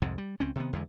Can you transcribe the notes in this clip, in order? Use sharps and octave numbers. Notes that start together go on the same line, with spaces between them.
C2 F2 G#2 C3
G3
C#2 C4 C#4
C3 D#3 B3
E2 D3 G#3